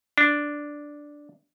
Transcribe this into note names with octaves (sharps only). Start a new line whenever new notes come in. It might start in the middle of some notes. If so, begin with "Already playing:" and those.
D4